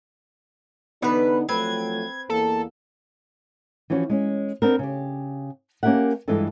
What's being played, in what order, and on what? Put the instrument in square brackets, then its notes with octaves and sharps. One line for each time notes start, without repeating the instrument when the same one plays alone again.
[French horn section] D3 D4 D#4 [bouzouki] E3 B4 [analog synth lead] B3
[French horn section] F3 F#3 A3 [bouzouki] C4 B4 [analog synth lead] G#6
[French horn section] E2 A#3 [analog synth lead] A4
[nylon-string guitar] E3 F3 C#4 F#4
G#3 C#4
B3 C4 D4 A#4
C#3 G4
A#3 C#4 G4 A#4 E5 F#5
G2 E3 G#3 F4 A4 A5